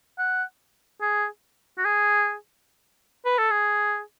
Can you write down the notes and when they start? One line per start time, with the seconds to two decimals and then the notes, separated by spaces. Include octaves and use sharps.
0.19 F#5
1.01 G#4
1.78 F#4
1.85 G#4
3.25 B4
3.38 A4
3.51 G#4